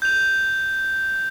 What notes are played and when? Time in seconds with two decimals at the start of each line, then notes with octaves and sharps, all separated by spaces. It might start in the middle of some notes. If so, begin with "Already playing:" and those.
0.02 G6 F7